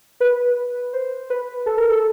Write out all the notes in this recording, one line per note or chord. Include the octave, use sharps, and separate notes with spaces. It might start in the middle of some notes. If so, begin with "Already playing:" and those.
B4
C5
B4
A4
A#4
A4